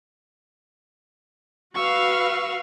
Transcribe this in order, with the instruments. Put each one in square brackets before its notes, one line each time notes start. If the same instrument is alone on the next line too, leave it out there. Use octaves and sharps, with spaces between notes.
[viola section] F#4 B4 F5 [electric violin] C#6 E6